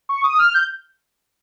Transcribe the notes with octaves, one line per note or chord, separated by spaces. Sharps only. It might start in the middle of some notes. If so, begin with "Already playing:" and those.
C#6
D#6
F6
G6